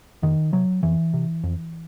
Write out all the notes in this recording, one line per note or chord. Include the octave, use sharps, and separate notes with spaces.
F2 D#3
C3 F#3
F2 E3
C3
F2